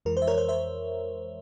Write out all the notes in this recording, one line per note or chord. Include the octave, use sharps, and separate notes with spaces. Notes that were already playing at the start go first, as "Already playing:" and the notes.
F2 E3 G#3 A#4
C5
E5
A#4 C#5
C5
C5 E5